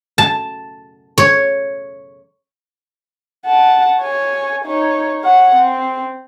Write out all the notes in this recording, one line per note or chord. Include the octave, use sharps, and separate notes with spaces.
A5
C#5
F#5 A5
C#5 G#5
D#4 C#5
C#5 F#5
C4